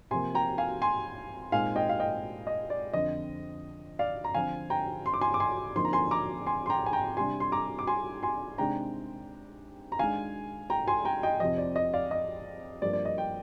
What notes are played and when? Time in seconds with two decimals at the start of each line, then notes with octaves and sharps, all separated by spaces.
0.11 C3 F3 A#3 G#5 C6
0.34 G5 A#5
0.58 F5 G#5
0.82 G#5 C6
1.52 A#2 G#3 C4 D#4 F5 G#5
1.76 D#5 G5
1.89 F5
2.00 D#5 G5
2.47 D#5
2.70 D5
2.93 F2 D3 F3 D#5
3.99 D5 F5
4.24 A#5
4.34 D3 F3 C4 F5 G#5
4.70 G5 A#5
5.06 C6
5.14 D6
5.21 G#5 C6
5.34 D6
5.40 G#5 C6
5.76 F2 D3 F3 A#3 D#4 C6
5.85 A#5
5.93 G#5 C6
6.11 A#5 D6
6.46 G#5 C6
6.66 C6
6.70 G5 A#5
6.86 G#5
6.93 G5 A#5
7.17 C3 G3 D4 G#5 C6
7.40 C6
7.52 A#5 D6
7.79 D6
7.87 G#5 C6
8.23 G#5 C6
8.58 C3 D#3 G#3 D4 G5 A#5
9.92 A#5
9.99 D#3 G#3 D4 F5 G#5
10.70 G5 A#5
10.88 G#5 C6
11.05 G5 A#5
11.23 D#5 G5
11.40 F2 C3 F3 D#5
11.58 D5
11.76 D#5
11.93 D5 F5
12.11 D#5
12.82 G2 F3 A#3 D5
12.93 D5
13.05 D#5
13.18 G5